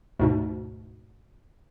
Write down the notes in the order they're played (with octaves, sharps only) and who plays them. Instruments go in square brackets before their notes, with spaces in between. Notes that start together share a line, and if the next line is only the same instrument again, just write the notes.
[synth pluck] D2 G#2 B2